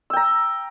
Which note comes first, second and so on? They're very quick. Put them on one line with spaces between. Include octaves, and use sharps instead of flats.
E6 G5 A#5